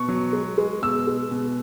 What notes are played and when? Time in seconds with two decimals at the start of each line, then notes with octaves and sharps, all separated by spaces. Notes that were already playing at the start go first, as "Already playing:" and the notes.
Already playing: B2 C#6
0.08 F#3
0.33 G#3
0.58 G#3
0.82 B2 E6
1.07 G#3
1.31 B2